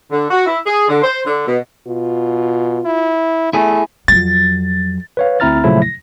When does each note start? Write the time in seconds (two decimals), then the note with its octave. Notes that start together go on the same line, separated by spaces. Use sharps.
0.11 D3
0.31 F#4
0.46 E4
0.65 G#4
0.88 D3
1.02 C5
1.27 D3
1.46 B2
1.87 B2 F4
2.85 E4
3.53 A3 E4 G#4
4.08 F2 F#3 A6
5.17 B4 C#5 F5
5.40 D2 C4 E4 A#5 F6 A6
5.64 A#2 C#3 F3 F#3 A3 E4
5.82 A#6